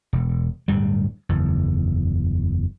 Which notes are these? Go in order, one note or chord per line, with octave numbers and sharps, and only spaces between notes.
E1
D1 G2 G3
F#1 E2